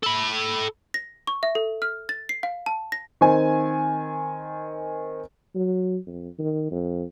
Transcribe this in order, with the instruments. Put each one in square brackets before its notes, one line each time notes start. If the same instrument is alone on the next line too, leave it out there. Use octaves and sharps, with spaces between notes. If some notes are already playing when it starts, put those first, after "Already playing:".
[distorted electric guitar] A4 B5
[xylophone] A#6
C#6
E5
A4
F6
A6
C7
F5
A5
A#6
[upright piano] D#3 C4 G#5
[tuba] F#3
F2
D#3
F2